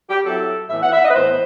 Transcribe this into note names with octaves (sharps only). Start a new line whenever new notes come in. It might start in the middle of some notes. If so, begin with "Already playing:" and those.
G4
F#3 C4 E4 A4
A2 E3 B3 E5
F#5
E5
D#5
B4
A2 E3 B3 C5